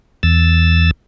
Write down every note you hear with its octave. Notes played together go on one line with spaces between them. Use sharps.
E2 E6 A6